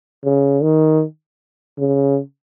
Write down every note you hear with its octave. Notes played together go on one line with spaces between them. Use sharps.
C#3
D#3
C#3